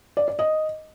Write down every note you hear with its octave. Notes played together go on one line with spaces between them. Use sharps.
D5
D5
D#5